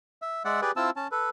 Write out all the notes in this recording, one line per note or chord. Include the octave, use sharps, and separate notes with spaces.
E5
G#3 D5 E5 F#5
G4 G#4 B4 D5
C4 E4 F4 A5 E6
C#4 A5
A4 B4